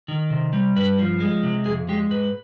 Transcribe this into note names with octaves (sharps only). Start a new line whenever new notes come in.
D#3
C3
G3
G2 B4
F3
G#3
C3
F2 G#4
G#3 G4
G#2 B4